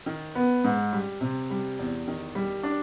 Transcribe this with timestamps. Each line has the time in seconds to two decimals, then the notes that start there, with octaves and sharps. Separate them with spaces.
0.06 D#3
0.35 B3
0.64 G#2
0.93 G3
1.21 C3
1.50 G3
1.79 E2
2.07 D#3
2.35 G3
2.63 D4